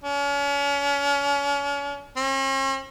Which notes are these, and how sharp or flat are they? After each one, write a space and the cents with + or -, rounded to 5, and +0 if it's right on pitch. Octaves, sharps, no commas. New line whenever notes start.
C#4 +40
C#4 -45